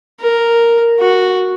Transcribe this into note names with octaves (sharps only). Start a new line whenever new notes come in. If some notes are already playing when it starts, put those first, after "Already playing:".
A#4
F#4